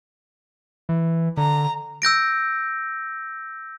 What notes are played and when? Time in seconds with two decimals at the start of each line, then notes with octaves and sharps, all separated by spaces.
0.89 E3
1.37 D3 A#5
2.02 E6 G6 A#6 D7